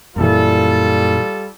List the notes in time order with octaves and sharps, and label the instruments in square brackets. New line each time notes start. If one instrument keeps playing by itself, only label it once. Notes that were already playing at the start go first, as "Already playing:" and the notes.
[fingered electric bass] F#2 A#2 E3 [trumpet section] G3 F4 A4